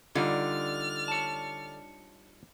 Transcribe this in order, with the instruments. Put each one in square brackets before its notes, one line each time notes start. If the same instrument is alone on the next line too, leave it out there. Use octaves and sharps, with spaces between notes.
[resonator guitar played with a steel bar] D3 [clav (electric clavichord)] G3 D#4 F4 [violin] F6 A6
[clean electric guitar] C#5 A5